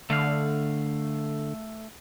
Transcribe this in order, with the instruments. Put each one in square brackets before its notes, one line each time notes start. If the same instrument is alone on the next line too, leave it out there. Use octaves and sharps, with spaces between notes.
[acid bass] D3 [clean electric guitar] A3 F5